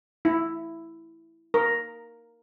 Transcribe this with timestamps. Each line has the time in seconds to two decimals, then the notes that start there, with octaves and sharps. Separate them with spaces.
0.25 E4
1.54 A#4